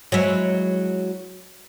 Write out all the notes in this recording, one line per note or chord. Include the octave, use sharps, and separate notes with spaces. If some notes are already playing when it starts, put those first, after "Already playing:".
F#3 G#3 E4